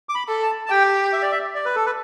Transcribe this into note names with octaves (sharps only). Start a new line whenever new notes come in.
D6
B5
A4
A5
A5
G4 G5
E5
D5
E5
D5
B4
A4
B4